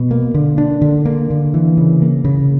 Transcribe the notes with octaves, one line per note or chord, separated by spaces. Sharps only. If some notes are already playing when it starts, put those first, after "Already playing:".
Already playing: B2
A#3
D3
D4
D3
A#3
D3
E3
C#3
A#3
C#3